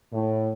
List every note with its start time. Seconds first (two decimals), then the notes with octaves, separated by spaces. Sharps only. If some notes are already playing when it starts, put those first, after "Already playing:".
0.13 A2